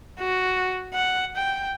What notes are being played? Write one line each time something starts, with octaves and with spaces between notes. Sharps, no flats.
F#4
F#5
G5